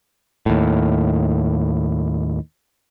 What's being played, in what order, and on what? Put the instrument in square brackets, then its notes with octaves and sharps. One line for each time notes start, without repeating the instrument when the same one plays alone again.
[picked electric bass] D#2 A2